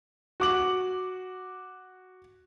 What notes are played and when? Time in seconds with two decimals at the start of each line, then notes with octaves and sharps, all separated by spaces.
0.40 F#4 D6 F#7